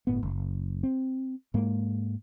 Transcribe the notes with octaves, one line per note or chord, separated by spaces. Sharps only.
G1 A2 B3
F#1
C4
G#2 G#3 A#3